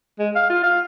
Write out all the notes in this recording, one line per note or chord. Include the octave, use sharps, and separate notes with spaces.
G#3
F5
F4
F5